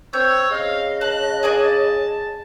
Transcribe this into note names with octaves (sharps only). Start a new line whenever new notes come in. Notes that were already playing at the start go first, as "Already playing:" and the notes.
C4 C#5 E6 G6
C#3 D#5 F5
A5 F#6
G#4 D5 G#5 A5